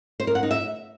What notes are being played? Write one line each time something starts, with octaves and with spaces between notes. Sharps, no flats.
C5
A#4
F#5
D#4
E5